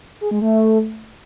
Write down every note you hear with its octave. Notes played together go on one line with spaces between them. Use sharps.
G#4
G#3
A3